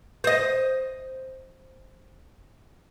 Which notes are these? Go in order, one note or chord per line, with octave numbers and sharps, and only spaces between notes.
C5 D#5